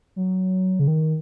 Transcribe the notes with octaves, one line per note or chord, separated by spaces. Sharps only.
F#3
C#3
D#3